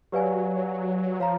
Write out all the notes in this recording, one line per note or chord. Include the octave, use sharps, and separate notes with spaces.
F#3 G4 B4 D5 F5 G#5
F3 C#5 F5 A#5